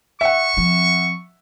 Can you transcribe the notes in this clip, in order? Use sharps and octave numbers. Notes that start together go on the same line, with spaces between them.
E5 F#5 C#6
F3 C4